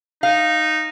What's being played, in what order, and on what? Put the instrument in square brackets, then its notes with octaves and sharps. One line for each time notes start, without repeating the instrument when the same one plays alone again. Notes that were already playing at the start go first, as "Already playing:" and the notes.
[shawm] D#4 [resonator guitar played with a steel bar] F5